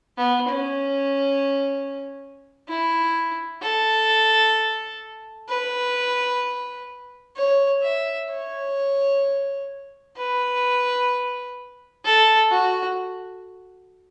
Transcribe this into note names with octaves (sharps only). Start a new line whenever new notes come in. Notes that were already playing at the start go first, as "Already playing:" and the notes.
B3
C#4
E4
A4
B4
C#5
E5
C#5
B4
A4
F#4